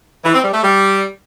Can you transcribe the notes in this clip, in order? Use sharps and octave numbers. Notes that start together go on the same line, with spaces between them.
E3
C4
G3
A3
G3